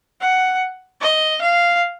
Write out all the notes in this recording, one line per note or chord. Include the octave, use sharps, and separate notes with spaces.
F#5
D#5
F5